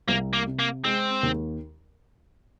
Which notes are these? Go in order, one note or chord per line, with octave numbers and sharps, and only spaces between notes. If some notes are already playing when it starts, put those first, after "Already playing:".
C2 A#3
A#3
C3
A#3
G#3 C4
D#2